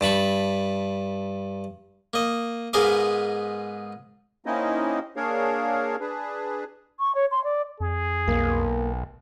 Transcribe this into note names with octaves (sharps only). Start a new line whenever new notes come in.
G2 A5 B5 C#6
A#3 D#5
G#2 G#3 B3 A#4 F5 D6
A#3 C4 C#4 D#4 E4 D#5
A#3 D4 G#4 A#4 C#5 F5
D4 G#4 B4
C#6
C#5
C6
D5
F2 G#4
B1 A#3